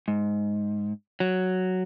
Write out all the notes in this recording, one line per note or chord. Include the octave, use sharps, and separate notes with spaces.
G#2
F#3